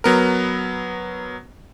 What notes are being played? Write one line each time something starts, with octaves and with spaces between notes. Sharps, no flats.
F#3 B3 A#4